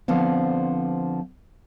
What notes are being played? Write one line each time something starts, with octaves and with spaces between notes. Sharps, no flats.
D3 F3 B3 C4